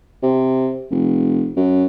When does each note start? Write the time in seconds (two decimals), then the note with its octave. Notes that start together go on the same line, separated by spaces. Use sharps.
0.23 C3
0.91 F1
1.56 F#2